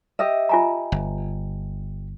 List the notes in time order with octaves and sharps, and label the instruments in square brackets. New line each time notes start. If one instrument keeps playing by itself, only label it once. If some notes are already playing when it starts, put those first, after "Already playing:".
[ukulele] G4 D#5 E5
[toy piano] F4 G#5 A#5
[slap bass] G1